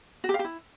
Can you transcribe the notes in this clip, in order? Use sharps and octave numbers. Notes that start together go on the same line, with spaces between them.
F#4
G4
F5
G4
E4